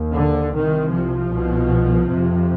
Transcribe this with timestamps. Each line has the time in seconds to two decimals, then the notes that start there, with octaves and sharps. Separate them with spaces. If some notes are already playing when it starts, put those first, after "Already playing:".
Already playing: D#2
0.14 D3
0.54 C2 C3 D#3
0.91 F3
1.31 C2 B2
2.09 F2 C3